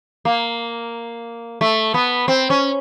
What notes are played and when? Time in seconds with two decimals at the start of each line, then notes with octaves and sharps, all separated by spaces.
0.25 A#3
1.61 A3
1.94 B3
2.28 C4
2.50 C#4